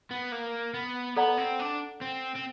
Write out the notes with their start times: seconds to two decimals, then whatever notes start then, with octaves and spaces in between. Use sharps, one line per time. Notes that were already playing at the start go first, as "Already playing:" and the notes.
0.11 B3
0.32 A#3
0.74 B3
1.16 B3 A4 D5 F#5 A#5
1.37 C4
1.59 D4
2.01 C4
2.35 C4